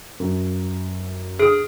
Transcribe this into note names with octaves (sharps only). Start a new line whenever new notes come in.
F#2
G#4 D#6 F6 D7